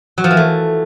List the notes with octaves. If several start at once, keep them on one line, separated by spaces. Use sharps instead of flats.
F#3
F3
E3
A3